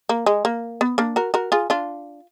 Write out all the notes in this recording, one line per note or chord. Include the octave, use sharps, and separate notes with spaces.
A#3
G#3
A#3
B3
A#3 D4
F#4 A#4
F#4 A#4
F4 G#4
D4 F4